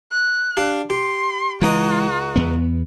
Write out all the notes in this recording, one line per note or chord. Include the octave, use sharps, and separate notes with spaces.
F#6
D4 G4 F5
G4 C6
C#2 E3 G#3 D#4 F#4 D#5
E2 B3